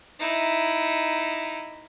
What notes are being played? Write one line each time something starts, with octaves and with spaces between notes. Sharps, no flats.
D#4 E4